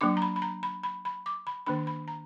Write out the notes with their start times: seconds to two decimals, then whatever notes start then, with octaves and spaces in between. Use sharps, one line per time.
0.01 F#3 A#3 D4 D6
0.17 A#5
0.22 B5
0.36 B5
0.42 A#5
0.63 B5
0.83 B5
1.05 B5
1.26 D6
1.47 B5
1.66 D#3 A#3 D4 B5
1.87 B5
2.08 A#5